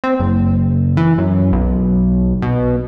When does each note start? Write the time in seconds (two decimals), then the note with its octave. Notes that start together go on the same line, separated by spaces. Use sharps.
0.04 C4
0.20 F#1
0.97 E3
1.18 F#2
1.52 B1
2.42 B2